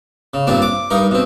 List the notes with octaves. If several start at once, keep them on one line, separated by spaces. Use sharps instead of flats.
C#3
G2 A#2 C4 D4
D6
G2 D#4 A#4
B2 C4